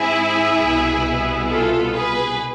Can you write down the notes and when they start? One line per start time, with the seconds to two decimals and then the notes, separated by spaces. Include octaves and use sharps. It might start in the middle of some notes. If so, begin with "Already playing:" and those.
Already playing: G#2 G#3 C4 E4 G#4
0.63 C2 B2 B3
1.50 F4 A4
1.94 G#4 B4